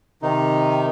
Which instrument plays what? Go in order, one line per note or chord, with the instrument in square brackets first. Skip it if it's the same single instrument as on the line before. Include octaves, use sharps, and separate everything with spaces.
[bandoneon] C3 D#3 D#4